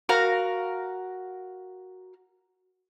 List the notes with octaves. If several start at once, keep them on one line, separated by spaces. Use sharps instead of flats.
F#4 A#4 F5 A#5